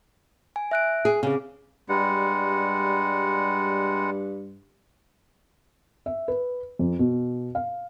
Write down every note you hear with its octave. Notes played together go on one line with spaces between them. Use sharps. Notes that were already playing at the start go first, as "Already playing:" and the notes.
G#5
E5 F#6 D7
G#4
C#3 C4 G#4
G2 G3 G#3 F#5
E5
B4
F2
B2
F5